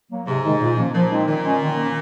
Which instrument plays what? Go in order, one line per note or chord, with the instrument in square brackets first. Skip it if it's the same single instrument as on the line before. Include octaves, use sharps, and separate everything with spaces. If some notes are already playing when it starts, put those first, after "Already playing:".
[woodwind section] F#3 A#3
[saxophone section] G#2 [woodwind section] C3
[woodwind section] D#3 G#3 D#4
A#2
F3 A#3 C#4
[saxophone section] A#2 [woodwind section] F3
[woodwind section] G#3 C4 D#4
[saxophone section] A#2 [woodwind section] D#3
[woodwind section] G#3 C#4
D#3
A#3 C#4